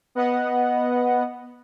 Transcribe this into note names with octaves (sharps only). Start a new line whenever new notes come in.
B3 D#5 F#5